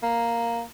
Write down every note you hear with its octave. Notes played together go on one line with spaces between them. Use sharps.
A#3